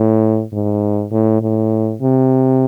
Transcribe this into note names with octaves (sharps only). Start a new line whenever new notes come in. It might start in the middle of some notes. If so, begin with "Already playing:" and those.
Already playing: A2
G#2
A2
A2
C3